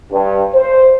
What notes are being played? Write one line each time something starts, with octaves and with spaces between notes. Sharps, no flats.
G2
C5